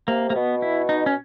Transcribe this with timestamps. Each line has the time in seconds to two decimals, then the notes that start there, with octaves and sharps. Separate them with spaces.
0.08 C3 A#3
0.30 C3 A#3
0.36 B2 B3
0.62 E4
0.89 D#4
1.06 C#4